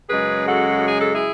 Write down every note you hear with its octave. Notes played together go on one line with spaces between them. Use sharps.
F#2 C#3 G#3 G#4 B4
F#4 A4
G#4
A4
E4 G#4